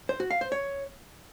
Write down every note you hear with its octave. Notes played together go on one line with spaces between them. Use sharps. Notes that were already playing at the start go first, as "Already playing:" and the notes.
C5
F#4
F5
C5
C#5